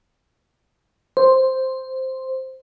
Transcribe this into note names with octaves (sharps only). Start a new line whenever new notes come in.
C5